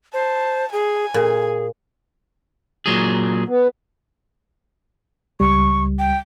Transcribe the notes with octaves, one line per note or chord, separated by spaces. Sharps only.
C5 A5
G#4 G#5
A#2 G#4
A#2 F#3 G#4
B3
C#2 G3 C#6
G5